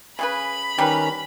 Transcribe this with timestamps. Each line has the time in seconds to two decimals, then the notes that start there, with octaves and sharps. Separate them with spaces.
0.19 C#3 G#4 B4 B5
0.78 D#3 G3 C#4 B4 A#5